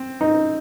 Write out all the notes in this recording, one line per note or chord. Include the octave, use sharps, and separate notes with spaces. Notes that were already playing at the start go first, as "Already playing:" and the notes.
Already playing: C4
D#4